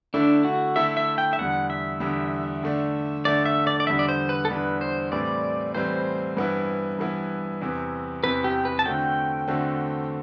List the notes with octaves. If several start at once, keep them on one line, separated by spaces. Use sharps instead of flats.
D3 A3 D4 E4 A4
F#4
D3 A3 E4 A4 E5
E5
G5
E5
E2 D3 G3 F#5
E5
E2 D3 G3
D3 A3 D4
D3 A3 D4 D5
E5
D5
D5
E2 D3 G3 D4 E5
D5
C5
B4
A4
E2 D3 G3 D4 B4
C5
A2 E3 G3 C4 D5
A2 E3 G3 C4 C5
G2 E3 B3 E4
G2 E3 B3 E4
E2 C3 E3
E2 C3 E3 B4
G4
B4
A5
D3 A3 C4 F#4 G5
D3 A3 C4 F#4